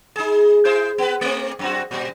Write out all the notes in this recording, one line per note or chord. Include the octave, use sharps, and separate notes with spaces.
D#4 G#4
E4 G#4 C5
B3 B4
A3 C4
F#2 C4 F#4
A#2 G3